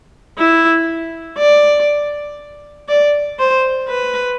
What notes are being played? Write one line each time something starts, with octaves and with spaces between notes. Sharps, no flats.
E4
D5
D5
C5
B4